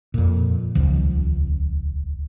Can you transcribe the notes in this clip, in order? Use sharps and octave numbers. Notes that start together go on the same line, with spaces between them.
F2 A#2
D#1 C#2 F3